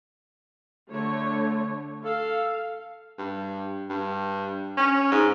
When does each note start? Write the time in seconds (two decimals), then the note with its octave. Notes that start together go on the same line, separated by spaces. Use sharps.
0.91 D3 A3 C#5
2.05 A4 F5
3.18 G2
3.90 G2
4.77 C#4
5.12 G#2